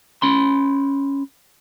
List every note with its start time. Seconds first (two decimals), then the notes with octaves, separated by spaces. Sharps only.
0.22 C#4 B5 C6